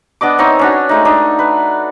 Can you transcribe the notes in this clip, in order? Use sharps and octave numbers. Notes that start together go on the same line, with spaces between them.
B3 D4 D#5 D6
C4 D#4 C#5 E5
C#4 D4 F#4
G#3 A3 D#4
D4 D#4
B4